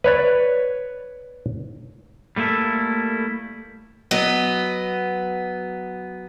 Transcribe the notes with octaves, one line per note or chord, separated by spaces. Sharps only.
B4 C#5 D5
G3 A3 A#3 E4 A4
F#3 B3 D#5